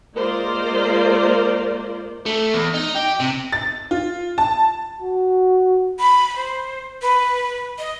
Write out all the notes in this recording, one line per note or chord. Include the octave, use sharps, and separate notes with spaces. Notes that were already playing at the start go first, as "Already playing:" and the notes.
G#3 A#3 F4 A#4 C5 D5
A3
E2
D#4
G4
C3
A6
F4
A5
F#4
B5
C5
B4
D#5